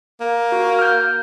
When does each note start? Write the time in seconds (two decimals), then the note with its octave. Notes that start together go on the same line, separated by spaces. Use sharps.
0.21 A#3
0.52 F#4
0.79 F6 G6